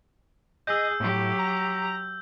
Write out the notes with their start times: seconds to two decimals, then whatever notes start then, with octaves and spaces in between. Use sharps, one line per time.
0.67 G#4 D#5 E6 G6
1.00 A2 F#3 G4
1.39 A#5